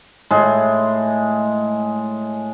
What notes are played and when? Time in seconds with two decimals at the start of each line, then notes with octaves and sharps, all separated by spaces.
0.31 A2 G#3